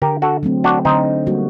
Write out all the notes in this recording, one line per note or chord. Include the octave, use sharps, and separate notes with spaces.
D3 G4 A#4
F#4 A4
F#3 A3 C4
D4 F#4
D3 C4 D#4
G3 A#3 F#4